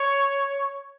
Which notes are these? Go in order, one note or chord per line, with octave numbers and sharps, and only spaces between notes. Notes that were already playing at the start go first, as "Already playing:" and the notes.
Already playing: C#5